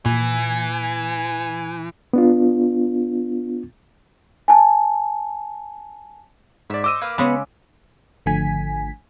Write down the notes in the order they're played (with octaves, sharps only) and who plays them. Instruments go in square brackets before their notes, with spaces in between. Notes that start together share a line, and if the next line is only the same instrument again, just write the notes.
[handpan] A#2 [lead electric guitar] E3 [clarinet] G#5
[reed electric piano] B3 D4 F4
[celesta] G#5 A5
[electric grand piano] G#2 D5 [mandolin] C#5 E5
[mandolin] D#4 C5 [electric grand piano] D6 E6 D#7
[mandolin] A#3 B4 F5
[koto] C#3 G#3 [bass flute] B3 [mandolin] B5 C#6
[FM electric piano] G#1 D3 F3 A3 G#5 B6